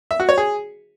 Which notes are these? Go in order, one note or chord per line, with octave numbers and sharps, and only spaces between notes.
E5
F#4
C#5
G#4